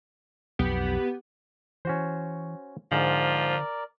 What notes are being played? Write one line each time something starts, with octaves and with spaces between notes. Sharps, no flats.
B1 F2 B3 G4
E3 C#4 F#4 C5
G#2 D3 F3 A#4 D5